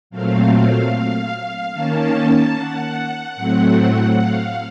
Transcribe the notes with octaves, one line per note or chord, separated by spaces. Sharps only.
A#2 F#3 A3 C4 F5
F5
D#3 A#3 C#4 A5
F#5
A2 F#3 A3 C4
F5